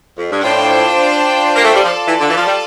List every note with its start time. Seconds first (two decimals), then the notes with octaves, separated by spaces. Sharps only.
0.17 F2
0.31 G2
0.43 A2 D4 F4 C5 G5
1.55 A#3
1.64 A3
1.75 G3
1.83 F3 F4 A4 D5 A5
2.07 E3
2.20 D3
2.29 E3
2.37 F3
2.46 G3